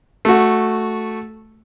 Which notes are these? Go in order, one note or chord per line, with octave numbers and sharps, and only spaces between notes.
A3 F#4